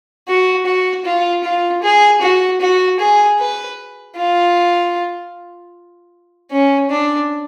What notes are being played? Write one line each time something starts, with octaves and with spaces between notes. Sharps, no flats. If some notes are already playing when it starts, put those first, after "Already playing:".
F#4
F#4
F4
F4
G#4
F#4
F#4
G#4
B4
F4
C#4
D4